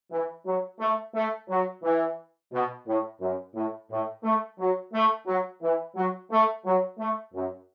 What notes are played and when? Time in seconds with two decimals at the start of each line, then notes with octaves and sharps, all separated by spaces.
0.11 E3
0.45 F#3
0.79 A3
1.15 A3
1.49 F#3
1.83 E3
2.52 B2
2.86 A2
3.20 F#2
3.55 A2
3.90 A2
4.24 A3
4.58 F#3
4.93 A3
5.26 F#3
5.62 E3
5.95 F#3
6.31 A3
6.65 F#3
6.99 A3
7.34 F#2